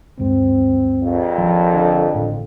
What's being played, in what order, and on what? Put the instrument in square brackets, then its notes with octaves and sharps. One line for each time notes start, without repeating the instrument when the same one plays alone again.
[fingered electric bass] D2 G2 G#3 [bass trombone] C4
[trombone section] A#1 F2
[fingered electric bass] G#1 F3
[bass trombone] D3
[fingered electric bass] G#1 A2